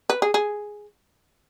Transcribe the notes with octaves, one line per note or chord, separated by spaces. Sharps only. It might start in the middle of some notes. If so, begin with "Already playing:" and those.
B4
G#4
G#4